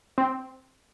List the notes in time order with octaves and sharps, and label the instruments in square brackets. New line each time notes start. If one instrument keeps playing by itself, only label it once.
[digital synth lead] C4